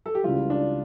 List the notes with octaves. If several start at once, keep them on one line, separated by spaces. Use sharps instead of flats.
A4
G4
C#2 C#3 E3 G3 F4
D4